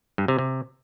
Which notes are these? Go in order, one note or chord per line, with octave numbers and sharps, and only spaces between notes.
G2
C3
C3